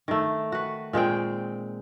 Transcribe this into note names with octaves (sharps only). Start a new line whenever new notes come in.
D#3 A3
F#4 B4
A#2 G#3 C4 G5